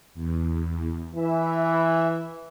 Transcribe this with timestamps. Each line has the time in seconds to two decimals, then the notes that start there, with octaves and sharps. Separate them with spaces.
0.14 E2
1.15 E3 E5